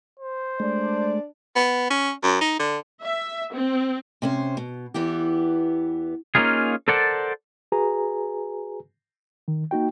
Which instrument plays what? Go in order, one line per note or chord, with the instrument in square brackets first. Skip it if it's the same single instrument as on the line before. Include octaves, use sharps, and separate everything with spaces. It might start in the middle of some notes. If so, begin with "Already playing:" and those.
[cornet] C5
[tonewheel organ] G#3 A3 [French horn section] D4 D5
[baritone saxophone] B3
C#4
F#2
D#4
D3
[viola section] E5
C4
[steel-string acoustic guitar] C3 C#4 C5
B2
E2 E3 B3 G4
[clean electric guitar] A#3 C#4 D#4 F4 G#4
A4 A#4 C5 D5 F#5 A5
[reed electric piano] F#4 G#4 B4 G#5 A#5
D#3
A#3 D#4 F#4 G5